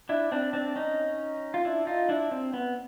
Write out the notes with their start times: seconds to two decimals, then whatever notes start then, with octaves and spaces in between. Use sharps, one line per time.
0.09 D4 E4
0.32 C4 D4
0.53 C4 D4
0.76 C#4 D#4
1.54 F4
1.65 D4 E4
1.87 D#4 F4
2.09 D4 E4
2.31 C4
2.54 B3